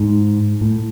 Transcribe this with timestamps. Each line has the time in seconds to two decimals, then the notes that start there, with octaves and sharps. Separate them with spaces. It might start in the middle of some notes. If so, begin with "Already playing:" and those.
Already playing: G#2
0.61 A2